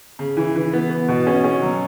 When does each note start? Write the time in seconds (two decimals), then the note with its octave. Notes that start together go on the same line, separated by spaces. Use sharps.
0.19 C#3
0.37 E3
0.56 E3
0.73 B3
0.90 B3
1.08 B2
1.27 C#4
1.44 C#4
1.62 F#3